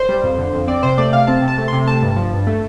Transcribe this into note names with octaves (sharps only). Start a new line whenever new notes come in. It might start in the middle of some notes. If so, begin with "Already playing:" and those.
Already playing: C5
G3
F2
D3
F2
C4 D5
C3 C5
A3 D5
C3 F5
C4 A5
C3
A5
A3
C3 C6
A3 A5
G2
F3
G2
A3